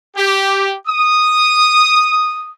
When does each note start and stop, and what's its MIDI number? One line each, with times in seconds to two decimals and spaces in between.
0.17 0.74 67
0.87 2.54 87